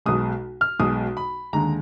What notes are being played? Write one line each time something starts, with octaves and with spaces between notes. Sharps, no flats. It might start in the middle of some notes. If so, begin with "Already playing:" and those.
B1 B2 G#3 D#6
F6
B1 B2 G#3 D#6
B5
D#2 D3 G#3 A#5